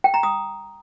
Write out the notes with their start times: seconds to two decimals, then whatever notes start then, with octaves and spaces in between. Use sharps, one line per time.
0.04 G5
0.14 A#5
0.23 D#6